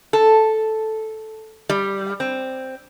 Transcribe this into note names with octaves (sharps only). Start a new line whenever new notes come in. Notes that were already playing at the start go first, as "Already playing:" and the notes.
A4
G3
C4